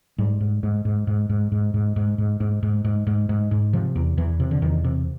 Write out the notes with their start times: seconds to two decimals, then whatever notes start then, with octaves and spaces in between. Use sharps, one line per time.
0.18 G#2 G3
0.40 G#2
0.63 G#2
0.85 G#2
1.07 G#2
1.29 G#2
1.52 G#2
1.74 G#2
1.96 G#2
2.18 G#2
2.40 G#2
2.63 G#2
2.85 G#2
3.07 G#2
3.29 G#2
3.51 G#2
3.73 C3 F3
3.96 E2
4.17 E2 E3
4.40 C3
4.51 D3
4.62 E2 D#3
4.84 C3